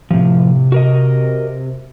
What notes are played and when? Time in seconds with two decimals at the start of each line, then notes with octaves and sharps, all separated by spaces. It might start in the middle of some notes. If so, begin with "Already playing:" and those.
0.11 A2 C3 F3
0.72 F#4 A#4 D#5